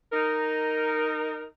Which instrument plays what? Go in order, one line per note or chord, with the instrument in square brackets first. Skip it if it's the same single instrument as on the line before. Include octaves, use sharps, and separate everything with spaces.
[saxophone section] D#4 A#4